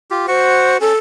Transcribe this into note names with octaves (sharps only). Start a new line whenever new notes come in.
F4 G4
F#4 C5 F#5
C#4 A4